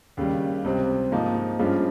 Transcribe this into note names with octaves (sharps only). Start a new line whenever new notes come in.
D#2 C#3 G3
C#2 C3 G3 C4
G#2 F3 A#3 D#4
G2 F3 G#3 C#4 F4